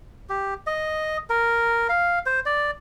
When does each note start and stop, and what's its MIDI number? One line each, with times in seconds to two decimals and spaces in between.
0.29 0.54 67
0.67 1.17 75
1.30 1.87 70
1.89 2.19 77
2.26 2.40 72
2.46 2.71 74